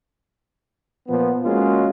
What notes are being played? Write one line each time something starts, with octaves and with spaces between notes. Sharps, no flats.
A#2 F3 B3
G#3 A#3 C#4 F4 F#4